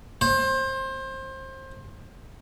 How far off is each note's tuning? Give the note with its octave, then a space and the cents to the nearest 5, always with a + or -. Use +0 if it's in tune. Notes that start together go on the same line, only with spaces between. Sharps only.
C5 +25